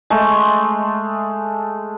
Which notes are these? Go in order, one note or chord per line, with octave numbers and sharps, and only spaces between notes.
G#3 A3